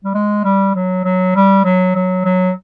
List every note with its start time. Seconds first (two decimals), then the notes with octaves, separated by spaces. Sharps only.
0.04 G3
0.14 G#3
0.44 G3
0.75 F#3
1.04 F#3
1.35 G3
1.65 F#3
1.96 F#3
2.25 F#3